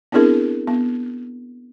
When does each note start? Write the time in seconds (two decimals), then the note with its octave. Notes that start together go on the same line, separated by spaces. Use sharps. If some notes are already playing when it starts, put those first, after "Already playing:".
0.12 B3 C4 D4 E4 G#4 A#4
0.67 B3